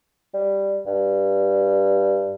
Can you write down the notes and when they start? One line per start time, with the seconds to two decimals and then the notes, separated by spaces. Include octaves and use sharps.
0.34 G3
0.86 G2